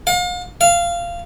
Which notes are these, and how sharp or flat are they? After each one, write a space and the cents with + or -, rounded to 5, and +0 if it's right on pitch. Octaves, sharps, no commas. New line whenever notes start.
F5 +40
F5 -15